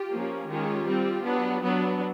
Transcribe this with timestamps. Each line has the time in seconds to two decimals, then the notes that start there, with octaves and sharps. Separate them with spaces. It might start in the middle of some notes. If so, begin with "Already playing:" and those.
Already playing: F4 G4
0.09 F3 A#3 C#4
0.48 D#3 G#3 C#4 F4 G4
0.86 G3 C4
1.24 F#3 B3 D4
1.63 F#3 B3 D4